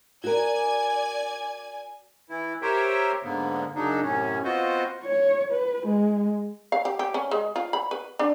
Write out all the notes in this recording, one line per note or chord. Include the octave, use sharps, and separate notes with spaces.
F#4 A#4 D5 G#5 G#6
E3 E4
G4 A#4 C5 C#5 E5 G5
G#2 D3 A#3 B3
F#2 C#3 F#3 D4 D#4
F#2 A2 C3 C#4
B3 C4 F4 F#4 C5 D#5
C#5
B4
G#3
F5
G4
G4
C#4
G#3
F4
B5
B4
D4